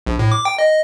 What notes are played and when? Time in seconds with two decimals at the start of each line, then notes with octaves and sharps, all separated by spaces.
0.07 A#1
0.19 A2
0.32 D6
0.45 G5
0.59 D#5